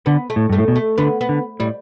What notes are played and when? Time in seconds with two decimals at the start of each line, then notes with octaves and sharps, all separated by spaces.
0.06 D3 B3
0.30 A3
0.36 A2
0.50 G2 A3
0.58 A2
0.68 B2
0.76 A3
0.98 D3 B3
1.21 B3
1.29 D3
1.60 A2 G3